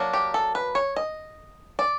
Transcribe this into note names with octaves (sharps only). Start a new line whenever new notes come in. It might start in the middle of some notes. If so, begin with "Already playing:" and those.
Already playing: F#3 A#3 D4
G4
A4
B4
C#5
D#5
D5